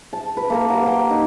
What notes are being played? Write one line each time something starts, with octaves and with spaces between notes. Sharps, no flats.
A5
B4
A#3 A4 A#4
G4 A#4 F#5
G5 C6
D#4